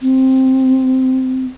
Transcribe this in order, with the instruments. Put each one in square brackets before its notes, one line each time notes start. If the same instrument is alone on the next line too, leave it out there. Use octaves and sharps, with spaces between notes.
[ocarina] C4